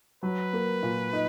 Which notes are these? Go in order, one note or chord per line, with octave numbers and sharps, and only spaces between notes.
F#3 B4
A#3
A#2
D#4